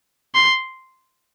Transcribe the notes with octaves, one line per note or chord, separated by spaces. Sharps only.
C6